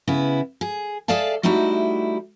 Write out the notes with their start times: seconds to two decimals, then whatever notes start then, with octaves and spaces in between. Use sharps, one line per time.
0.08 C#3 B3 E4
0.61 G#4
1.08 G#4 A4 D5 E5 F5 A5
1.43 G3 A3 D#4 E4 F#4